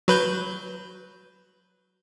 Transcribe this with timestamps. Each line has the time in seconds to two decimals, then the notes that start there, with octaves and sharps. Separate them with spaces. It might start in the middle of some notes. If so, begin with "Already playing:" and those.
0.08 F#3 B4 G6